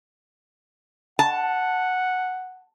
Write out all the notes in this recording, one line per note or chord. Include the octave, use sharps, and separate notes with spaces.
F#5 A5